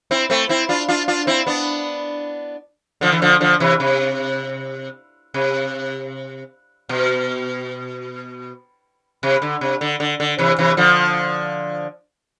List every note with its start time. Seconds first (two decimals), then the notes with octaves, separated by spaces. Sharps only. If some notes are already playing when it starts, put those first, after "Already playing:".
0.11 C4 E4
0.30 A3 C4
0.49 C4 E4
0.69 D4 F4
0.88 D4 F4
1.08 D4 F4
1.27 C4 E4
1.46 B3 D4
3.01 D3 F3
3.12 E3
3.22 D3 F3
3.40 D3 F3
3.60 C3 E3
3.80 C3
5.34 C3
6.89 B2
9.23 C3
9.42 D3
9.61 C3
9.81 D3
10.00 D3
10.20 D3
10.38 C3 E3
10.59 C3 E3
10.77 D3 F3